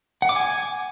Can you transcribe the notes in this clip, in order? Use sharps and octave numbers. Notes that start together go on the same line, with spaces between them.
F#5
D6
G#5